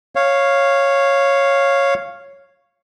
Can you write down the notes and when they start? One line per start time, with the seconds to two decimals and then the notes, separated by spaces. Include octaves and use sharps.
0.16 C#5 F5